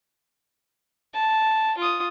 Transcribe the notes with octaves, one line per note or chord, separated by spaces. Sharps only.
A5
F4 D#6